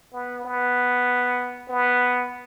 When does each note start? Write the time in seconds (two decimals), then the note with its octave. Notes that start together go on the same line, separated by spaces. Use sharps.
0.13 B3
0.45 B3
1.69 B3